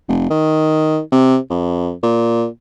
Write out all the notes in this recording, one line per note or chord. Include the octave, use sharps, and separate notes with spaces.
F1
D#3
C3
F2
A#2